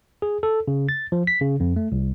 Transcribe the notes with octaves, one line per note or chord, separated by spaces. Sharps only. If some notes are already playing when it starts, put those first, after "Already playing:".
G#4
A4
C#3
A6
F3
B6
C#3
F2
A3
C2